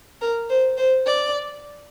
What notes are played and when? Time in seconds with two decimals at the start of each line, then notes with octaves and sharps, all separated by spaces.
0.21 A#4
0.49 C5
0.77 C5
1.07 D5